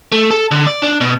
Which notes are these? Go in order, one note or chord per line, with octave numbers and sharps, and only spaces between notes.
A3
A4
D3
D5
D4
B2